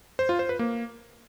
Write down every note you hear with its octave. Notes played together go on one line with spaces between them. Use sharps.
C5
F4
C5
B4
A#3